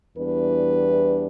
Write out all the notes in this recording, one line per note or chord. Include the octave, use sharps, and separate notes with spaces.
E2 E3 G3 B3 D4 B4